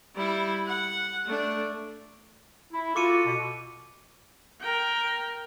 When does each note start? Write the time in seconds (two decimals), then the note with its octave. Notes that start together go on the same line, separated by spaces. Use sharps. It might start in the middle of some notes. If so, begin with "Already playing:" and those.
0.15 G3 E4
0.67 F#5
1.26 A3 D4
2.73 E4
2.96 F4 F#4 A4 D6 C#7 D#7
3.27 B2
4.61 A#4 G5